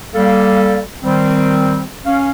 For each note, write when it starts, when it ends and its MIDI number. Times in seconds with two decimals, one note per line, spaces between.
0.14 0.79 55
0.14 0.79 58
0.14 0.79 69
0.14 0.79 77
1.03 1.82 51
1.03 1.82 55
1.03 1.82 60
2.05 2.29 61
2.05 2.29 77